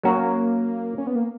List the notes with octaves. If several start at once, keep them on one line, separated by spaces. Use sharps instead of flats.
F#3 A#3 C#4 F#4
C#4
B3
A#3